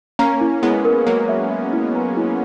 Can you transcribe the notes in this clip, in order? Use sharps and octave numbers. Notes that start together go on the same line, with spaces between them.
A#3 C#4 A#5
E4
G#3 B3 E4
A#4
F#3 A#3 A#4
E5
E5
E4
A#5
E4